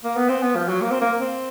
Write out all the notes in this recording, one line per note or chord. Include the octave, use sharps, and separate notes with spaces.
A#3
B3
C4
B3
F3
F#3
A#3
C4
A#3
C4